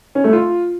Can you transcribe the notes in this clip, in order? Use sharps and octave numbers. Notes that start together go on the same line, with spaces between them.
C#4
A3
F4